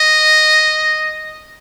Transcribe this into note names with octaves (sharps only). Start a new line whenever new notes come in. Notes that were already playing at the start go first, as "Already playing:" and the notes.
Already playing: D#5